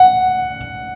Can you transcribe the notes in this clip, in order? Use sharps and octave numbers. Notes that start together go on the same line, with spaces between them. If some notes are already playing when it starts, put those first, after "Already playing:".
Already playing: F#5